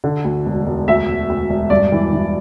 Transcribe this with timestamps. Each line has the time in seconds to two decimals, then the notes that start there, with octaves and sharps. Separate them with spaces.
0.04 D3
0.25 D2
0.46 E1
0.66 E1
0.88 D2 E5
1.08 E1
1.29 D2
1.49 E1
1.70 G2 D5
1.92 E3
2.13 E3